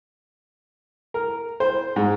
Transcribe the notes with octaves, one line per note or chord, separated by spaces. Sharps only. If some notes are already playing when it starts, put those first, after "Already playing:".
A#4
C5
G#2